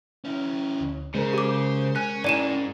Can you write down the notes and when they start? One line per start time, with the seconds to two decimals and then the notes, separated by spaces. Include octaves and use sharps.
0.25 C#4 E4
0.81 D2
1.15 C#3 G#3 A#4 C5
1.33 G4 D6
1.96 C#4 G#5 F#6
2.24 G#2 C#4 E4 D5 D#7 E7